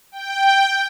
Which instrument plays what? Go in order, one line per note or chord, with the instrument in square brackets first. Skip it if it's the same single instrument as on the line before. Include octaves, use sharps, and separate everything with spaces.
[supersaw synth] G5